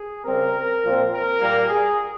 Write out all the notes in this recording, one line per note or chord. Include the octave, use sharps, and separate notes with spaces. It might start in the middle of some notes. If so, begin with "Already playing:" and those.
Already playing: G#4
C#3 G3 C4 A#4
A#2 F3 C4
A#4
A#2 G3 A#3
G#4